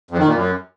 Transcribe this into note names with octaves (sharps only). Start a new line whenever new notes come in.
F2
D#3
A#2
F#2